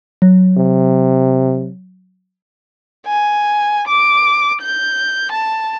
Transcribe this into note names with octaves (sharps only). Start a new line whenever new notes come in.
F#3
C3
G#5
D6
G6
A5